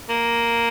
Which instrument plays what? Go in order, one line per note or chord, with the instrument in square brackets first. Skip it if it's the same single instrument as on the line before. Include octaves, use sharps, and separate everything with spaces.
[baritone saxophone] A#3